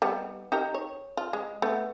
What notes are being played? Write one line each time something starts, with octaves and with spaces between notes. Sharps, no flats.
G3 B3 D#4
D#4 G4 A#4
C#5
F4
G#3
A3 B3